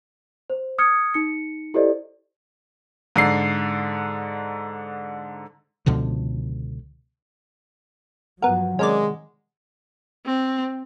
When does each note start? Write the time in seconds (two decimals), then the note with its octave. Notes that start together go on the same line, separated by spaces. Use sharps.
0.50 C5
0.79 D#6 F6 G#6 C#7
1.14 D#4 C#7
1.74 E4 G4 A4 C5 D5 D#5
3.16 G#2 D3 C7
5.86 C#2 B2 D3 F3
8.42 G2 F3 F#3 B3 A#4 F#5 A#5
8.79 C3 D#3 G#3 C#4 A#4 D5
10.26 C4